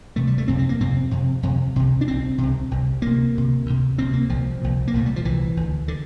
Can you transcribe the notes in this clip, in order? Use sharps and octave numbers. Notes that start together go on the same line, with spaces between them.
E2 C3 A3
G3
A3
F2 C3 C4
C4
A#3
F2 C3 C4
F2 C3
F2 C3
C2 C3
D4
C2 C3 C4
C2 C3
C2 C3
D2 C3 A#3
D2 C3
D2 C3
D2 C3 C4
A#3
C2 A#2 F3
C2 A#2
A#3
C2 A#2 A3
G3
F3
C2 A#2 E3
D2 D3
D3